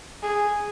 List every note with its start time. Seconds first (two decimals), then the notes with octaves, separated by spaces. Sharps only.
0.23 G#4